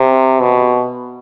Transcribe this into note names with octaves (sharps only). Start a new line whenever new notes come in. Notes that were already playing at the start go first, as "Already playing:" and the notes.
Already playing: C3
B2